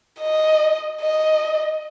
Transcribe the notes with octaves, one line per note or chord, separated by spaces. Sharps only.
D#5
D#5